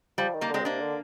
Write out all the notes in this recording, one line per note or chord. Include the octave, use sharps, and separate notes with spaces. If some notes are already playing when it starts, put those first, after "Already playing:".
F3 G3
D#3
G3 A#3
D3 G#3 C4
A#2
C3 A#3 D4
D3